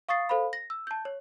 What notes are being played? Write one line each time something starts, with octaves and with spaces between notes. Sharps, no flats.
F5 C#6 D#6 A6 C7
A4 C5 F5 B5
A#6
E6
A5 G6
C#5